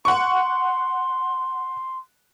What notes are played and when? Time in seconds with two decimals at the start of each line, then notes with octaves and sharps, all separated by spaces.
0.05 F#5 C6 C#6